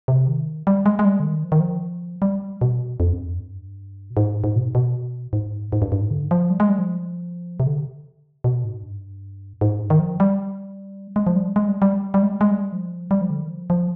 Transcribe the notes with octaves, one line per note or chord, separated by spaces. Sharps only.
C3
D#3
G3
G#3
G#3
G3
D3
D#3
F3
D#3
F3
G3
B2
F2
G2
F2
G2
B2
G#2
G#2
B2
B2
G#2
G#2
G2
G2
G#2
D3
F3
G3
G#3
G3
F3
C3
D3
B2
G#2
G2
G#2
G2
D#3
F3
G3
G#3
F3
G3
G#3
G3
G3
G3
G#3
G3
G#3
G3
F3
G3
F3
D3
D#3
F3
F3